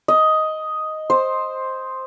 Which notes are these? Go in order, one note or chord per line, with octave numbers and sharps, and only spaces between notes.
D#5
C5